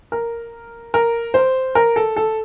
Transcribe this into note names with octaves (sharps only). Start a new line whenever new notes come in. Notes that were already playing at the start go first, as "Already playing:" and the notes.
A#4
A#4
C5
A#4
A4
A4